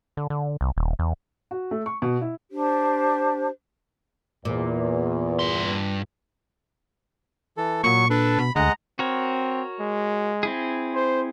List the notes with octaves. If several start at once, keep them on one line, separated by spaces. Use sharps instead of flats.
D3
D3
C2
D#1
E2
F#4
A3
C#6
B2
E4
D4 G4 C5
E2 A#2
G2 C6
E3 A4
A#2 F#3 C#6
D4 A4 B4
B2 B5
D2 G#3 D#5 F#5 A#5
C4 F#4 A#4 C#5
G#3
C4 E4 G#4
C5